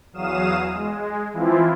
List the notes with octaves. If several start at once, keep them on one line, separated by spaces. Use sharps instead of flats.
E2 F#3 F5 D#6 E7
G#3
E3 F3 C4 E4 F4